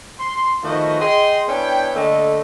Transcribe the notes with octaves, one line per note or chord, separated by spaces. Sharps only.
C6
D#3 F3 A3 B3 F#4 D#5
G#4 D#5 G5 C6
B3 C#4 D4 E4 G5
D3 A3 A#3 D#5